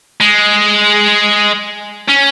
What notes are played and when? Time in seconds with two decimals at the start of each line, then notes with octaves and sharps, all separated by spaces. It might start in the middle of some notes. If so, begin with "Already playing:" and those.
0.20 G#3
2.08 C#4